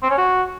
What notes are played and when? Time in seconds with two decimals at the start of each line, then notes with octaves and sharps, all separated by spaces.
0.03 C4
0.10 C#4
0.17 F#4